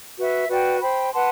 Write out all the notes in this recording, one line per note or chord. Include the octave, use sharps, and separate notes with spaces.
F#4 B4 E5
F#4 B4 D5 G5
C5 G5 B5
B4 F#5 A5 C6